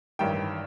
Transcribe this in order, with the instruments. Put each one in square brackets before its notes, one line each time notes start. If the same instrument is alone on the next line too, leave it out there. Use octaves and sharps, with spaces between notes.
[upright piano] A1 G2 D#3 G5